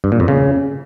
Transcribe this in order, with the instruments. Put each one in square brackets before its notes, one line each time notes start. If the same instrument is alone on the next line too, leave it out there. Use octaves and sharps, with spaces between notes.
[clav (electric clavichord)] G2
A#2
F2
C#3